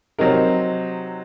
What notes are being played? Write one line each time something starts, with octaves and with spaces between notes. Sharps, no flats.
C3 F#3 C4 D#4 A#4